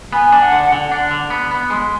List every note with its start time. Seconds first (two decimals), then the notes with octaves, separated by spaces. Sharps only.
0.13 B3 G#5
0.32 D4
0.42 F#5
0.52 D3
0.72 D3
0.92 D4
1.11 D3
1.30 B3
1.51 B3
1.70 G#3